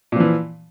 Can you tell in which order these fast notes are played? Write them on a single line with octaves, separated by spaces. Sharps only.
A#2 F3 E3